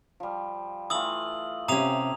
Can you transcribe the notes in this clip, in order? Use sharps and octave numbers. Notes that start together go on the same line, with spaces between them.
F3 G3
E3 A3 F4 D#6 E6 F#7
C3 C#4 A#5 D#6 F7